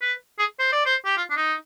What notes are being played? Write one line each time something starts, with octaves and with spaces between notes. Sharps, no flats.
B4
G#4
C5
D5
C5
G4
F4
D4
D#4